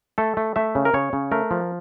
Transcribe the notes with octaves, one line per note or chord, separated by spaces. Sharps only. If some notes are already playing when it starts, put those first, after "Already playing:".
A3 A4
A3
A3 E5
C#3
A#4
C#3 C#5
C#3
A3 A#4
F3